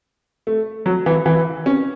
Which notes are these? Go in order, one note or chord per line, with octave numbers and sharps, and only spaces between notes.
A3
F#3
E3
E3
C#4